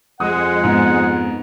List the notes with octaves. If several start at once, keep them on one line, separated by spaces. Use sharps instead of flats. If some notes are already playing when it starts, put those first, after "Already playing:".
F2 G#3 F#5 D#6
G#2 B3